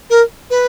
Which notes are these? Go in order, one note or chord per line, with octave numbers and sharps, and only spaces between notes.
A#4
B4